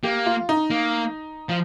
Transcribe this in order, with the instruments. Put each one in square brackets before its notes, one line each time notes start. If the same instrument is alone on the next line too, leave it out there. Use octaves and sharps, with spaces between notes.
[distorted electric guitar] A#3 [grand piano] G4
[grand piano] F4
D#4
[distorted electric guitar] A#3
F3